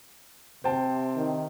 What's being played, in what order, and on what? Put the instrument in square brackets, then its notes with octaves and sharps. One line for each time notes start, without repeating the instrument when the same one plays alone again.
[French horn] C3 [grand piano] C5 G5 A5
[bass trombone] D#3